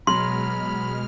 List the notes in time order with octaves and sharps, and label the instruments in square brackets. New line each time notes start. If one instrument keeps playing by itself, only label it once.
[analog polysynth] B2 G#3 F6 [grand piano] F#3 [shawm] B5 [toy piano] C6